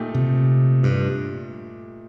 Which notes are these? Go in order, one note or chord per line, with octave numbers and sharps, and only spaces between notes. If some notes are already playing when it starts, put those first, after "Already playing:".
Already playing: A#2 A3 D#4 G4
C3
G2